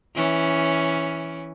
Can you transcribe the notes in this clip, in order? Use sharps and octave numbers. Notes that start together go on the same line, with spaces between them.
E3 C#4